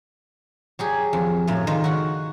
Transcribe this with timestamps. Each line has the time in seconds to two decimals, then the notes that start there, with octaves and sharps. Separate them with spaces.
0.79 F#3 G4 G#4
1.13 F2
1.48 F#2 A2 C#3
1.67 D#3 F4
1.84 F#4 F#5